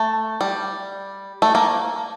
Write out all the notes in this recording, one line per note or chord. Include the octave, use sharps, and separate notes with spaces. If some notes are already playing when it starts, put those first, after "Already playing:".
Already playing: A3
G3
A3
A#3